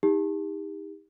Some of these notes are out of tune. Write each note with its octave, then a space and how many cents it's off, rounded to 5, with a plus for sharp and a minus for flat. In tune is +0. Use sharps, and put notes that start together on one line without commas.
D#4 +30 G4 +35